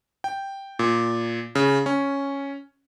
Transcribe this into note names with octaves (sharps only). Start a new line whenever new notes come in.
G5
A#2
C#3
C#4